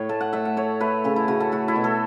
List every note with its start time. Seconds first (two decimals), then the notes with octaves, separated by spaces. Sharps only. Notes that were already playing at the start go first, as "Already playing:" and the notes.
Already playing: A2 C#5
0.09 A3 A5
0.21 F#5
0.33 A3 E5
0.45 F#5
0.57 A3 C#5
0.80 A3 B4
1.04 C#3 A4
1.16 E4
1.28 C#3 F#4
1.40 A4
1.52 A3 F#4
1.68 E4
1.76 B2
1.84 A4